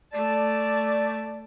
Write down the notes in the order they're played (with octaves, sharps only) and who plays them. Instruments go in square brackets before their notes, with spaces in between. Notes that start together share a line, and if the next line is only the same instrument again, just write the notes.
[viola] A3 A5 [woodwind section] D5